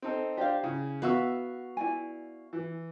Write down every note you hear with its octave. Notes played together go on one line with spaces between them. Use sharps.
C4 D#4 A4
D4 G4 C5 F5
C#3 E4
B3 F#4 E5 F5 C#6 E6
E4 D5 G#5
E3